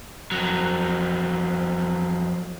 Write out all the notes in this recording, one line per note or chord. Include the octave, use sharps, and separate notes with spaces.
F2 F#3